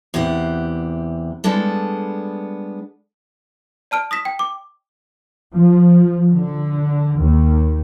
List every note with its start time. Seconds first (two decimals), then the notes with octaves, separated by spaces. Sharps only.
0.14 E2 C3 G4 F#5
1.44 G3 G#3 B3 D4 A4
3.91 D5 A5 F6 D7
4.11 D#6 A#6 B6 E7
4.25 G5
4.39 D6
5.55 F3
6.33 D3
7.19 D#2